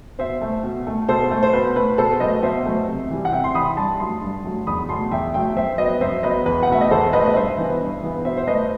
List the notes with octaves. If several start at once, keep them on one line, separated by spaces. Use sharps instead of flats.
B2 C5 E5
A3
B2
A3
B2 A4 C5
A3
C5
B2 B4
A3 B4
B2 A4 C5
F#3 A3 B4 D#5
B2 C5 E5
F#3 A3
C3
E3 G3
F#5
C3 E5 G5
C6
E3 G3 B5 D#6
G2 A5 C6
F#3 A3 A5 C6
G2
F#3 A3
E2 B5 D#6
B2 F#3 A3 A5 C6
E2 E5 G5
B2 F#3 A3 E5 G5
F#2 C5 E5
F#3 B3 B4 D#5
F#2 C5 E5
F#3 B3 B4 D#5
E2 B4
F#5
B2 A3 E5
D#5
E2 A4 C5
B2 A3 B4 D#5
D#5
G2 C5 E5
E3 B3
G2
E3 B3
B2 C5 E5
C5
A3 B4 D#5